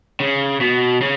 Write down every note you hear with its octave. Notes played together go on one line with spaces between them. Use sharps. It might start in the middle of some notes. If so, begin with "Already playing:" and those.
C#3
B2
C#3